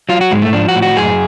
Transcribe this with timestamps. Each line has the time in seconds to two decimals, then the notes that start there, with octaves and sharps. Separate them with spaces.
0.09 F#3 F4
0.21 F#4
0.31 G#2 G#3
0.42 A3
0.53 F3 D4
0.68 F#4
0.75 A2
0.82 F#4
0.97 F#2 G#4